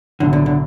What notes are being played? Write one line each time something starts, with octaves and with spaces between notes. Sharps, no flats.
B1 A2 D3 F#3
D3
D3